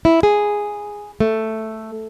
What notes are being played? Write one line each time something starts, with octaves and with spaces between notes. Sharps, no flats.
E4
G#4
A3